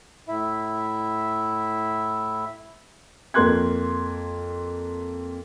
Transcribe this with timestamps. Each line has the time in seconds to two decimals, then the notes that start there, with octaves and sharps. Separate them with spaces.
0.28 A2 E4 E5
3.34 F2 A#3 A#4 C6 F#6 G#6